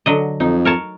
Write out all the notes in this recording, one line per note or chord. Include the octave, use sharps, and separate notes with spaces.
D3 F#3 D#5
F2 D#4
A#4 C#5 A5